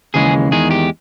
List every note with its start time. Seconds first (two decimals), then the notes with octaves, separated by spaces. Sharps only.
0.14 D#2 C#3 E3 G#3 G#4
0.51 E2 D#3 G#3 G#4
0.71 G4